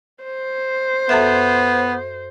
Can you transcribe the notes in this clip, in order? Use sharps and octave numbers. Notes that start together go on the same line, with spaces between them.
C5
F#2 B3 A4 E5